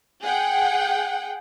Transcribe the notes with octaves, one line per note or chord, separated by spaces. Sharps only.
G#4 F#5 G5